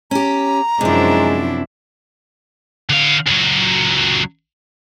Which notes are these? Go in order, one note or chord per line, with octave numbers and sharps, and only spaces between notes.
C#4 G4 A#5
F#2 C3 F3 G#3 D4 E4
D3 F5
C#2 F#3